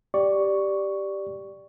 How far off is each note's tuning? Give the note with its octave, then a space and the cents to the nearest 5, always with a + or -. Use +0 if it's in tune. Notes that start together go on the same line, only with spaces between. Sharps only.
G4 +0 D5 +0 C#6 +5